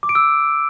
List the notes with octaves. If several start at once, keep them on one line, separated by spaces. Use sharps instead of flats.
D6
D7
E6